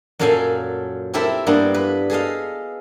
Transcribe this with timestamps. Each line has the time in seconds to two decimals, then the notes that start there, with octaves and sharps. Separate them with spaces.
0.19 F#2 A#2 F#3 A4 F5 G#5
1.14 C4 E4 G4 A4 A#4 E5
1.46 G2 G3 A#3 B3 D4
1.74 B4
2.10 G#4 A4 D#5 F5